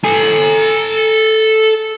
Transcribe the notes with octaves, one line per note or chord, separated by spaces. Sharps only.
A4 G#5